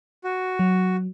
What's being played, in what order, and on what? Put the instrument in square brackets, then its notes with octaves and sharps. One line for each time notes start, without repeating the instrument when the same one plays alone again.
[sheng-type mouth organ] F#4
[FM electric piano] F#3